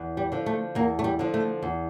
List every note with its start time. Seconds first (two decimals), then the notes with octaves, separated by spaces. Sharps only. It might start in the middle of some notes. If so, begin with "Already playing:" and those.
Already playing: E2
0.17 G3
0.32 D3 F3
0.46 A3
0.75 E2 A#3
0.99 A3
1.04 G3
1.19 D3 F3
1.34 A3
1.63 E2